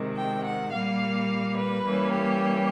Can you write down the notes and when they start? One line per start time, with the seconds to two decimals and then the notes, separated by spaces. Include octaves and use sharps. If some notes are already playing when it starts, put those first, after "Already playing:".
Already playing: C3 D#3 G#3
0.17 G5
0.45 F#5
0.72 A#2 G3 A#3 F5
1.57 B4
1.86 E3 G3 A#3 C#4
2.13 G4